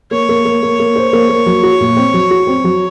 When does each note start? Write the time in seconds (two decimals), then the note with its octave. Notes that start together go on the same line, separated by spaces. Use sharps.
0.11 A#3 C#5
0.29 A#3
0.45 A#3
0.62 A#3
0.79 A#3
0.96 C5
1.13 A#3
1.29 A#3
1.46 F#3
1.63 F#4
1.81 A#2
1.96 C4
2.14 F#3
2.30 F#4
2.47 C4
2.64 F#3